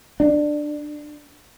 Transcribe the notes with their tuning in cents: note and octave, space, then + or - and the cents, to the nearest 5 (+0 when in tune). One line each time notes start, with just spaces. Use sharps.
D4 +15